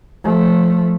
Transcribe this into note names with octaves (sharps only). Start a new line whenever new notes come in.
F3 A3